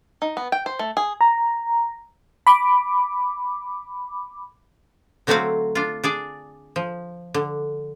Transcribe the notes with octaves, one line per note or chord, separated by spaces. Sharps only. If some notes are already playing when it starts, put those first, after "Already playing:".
D#4
B3
G5
C5
A3
G#4
A#5
B5 D6
D3 F#3 A3 C4 F#4 F5
D4 F4
D4 G#4 D5
F3
D3